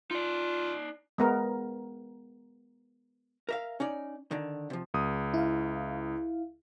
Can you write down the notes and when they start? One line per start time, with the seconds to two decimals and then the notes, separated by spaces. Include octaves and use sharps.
0.11 D#4 F4 D5
1.18 G#3 B3 A#4
3.49 A#4 E5 F5
3.80 C#4 D#4 D5
4.31 D3 D#3
4.70 C3 F3
4.94 C#2 D#6
5.34 E4 F5